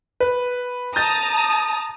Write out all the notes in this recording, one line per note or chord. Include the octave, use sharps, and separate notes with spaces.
B4
A5 A#5 D#6 G6 A6